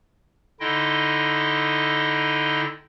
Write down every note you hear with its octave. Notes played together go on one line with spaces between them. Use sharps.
D3 D#4 E4 D#5 G5 C6